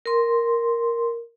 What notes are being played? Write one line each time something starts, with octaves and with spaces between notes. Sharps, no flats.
A#4 C6